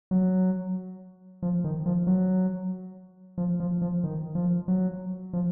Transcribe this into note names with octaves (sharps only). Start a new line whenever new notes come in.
F#3
F3
D#3
F3
F#3
F3
F3
F3
D#3
F3
F#3
F3